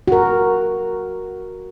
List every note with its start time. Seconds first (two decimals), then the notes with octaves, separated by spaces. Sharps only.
0.08 F#4 A#4